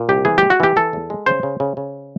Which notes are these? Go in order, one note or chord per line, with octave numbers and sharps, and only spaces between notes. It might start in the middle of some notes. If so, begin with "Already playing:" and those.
Already playing: A#2
C2 G4
E3 G#4
G#3 G4
F#4
E3 G4
E3 A4
E2
G#3
C#3 C5
C#3
C#3
C#3